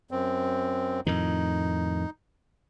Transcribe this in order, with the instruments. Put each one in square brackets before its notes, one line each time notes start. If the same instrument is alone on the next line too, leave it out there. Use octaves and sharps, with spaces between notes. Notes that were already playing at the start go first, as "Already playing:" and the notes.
[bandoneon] F#2 C4
[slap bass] F2 A2 D#3 [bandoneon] D#4